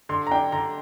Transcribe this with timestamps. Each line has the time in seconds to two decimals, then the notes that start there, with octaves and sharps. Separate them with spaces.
0.09 D3 C6
0.27 A#5
0.31 D4 G5
0.52 D3 A#5